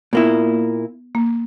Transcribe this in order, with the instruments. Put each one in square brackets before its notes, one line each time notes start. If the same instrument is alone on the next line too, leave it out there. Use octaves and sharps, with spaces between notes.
[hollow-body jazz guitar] A#2 A#3 E4 [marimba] B3
[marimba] A#3